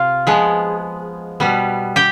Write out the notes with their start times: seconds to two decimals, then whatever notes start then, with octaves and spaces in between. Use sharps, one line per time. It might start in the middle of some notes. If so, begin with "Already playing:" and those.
Already playing: C3 F4 F5
0.27 F3 G#3 B3
1.40 B2 G3 B3
1.96 G4 G5